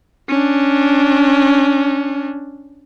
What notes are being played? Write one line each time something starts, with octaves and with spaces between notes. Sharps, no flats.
C#4 D4